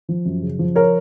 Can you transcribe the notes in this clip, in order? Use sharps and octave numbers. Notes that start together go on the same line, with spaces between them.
F3
F#2
C#3
F3
A#4 C#5